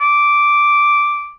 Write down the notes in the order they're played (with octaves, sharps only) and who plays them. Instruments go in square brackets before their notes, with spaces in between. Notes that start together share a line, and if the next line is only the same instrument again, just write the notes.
[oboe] D6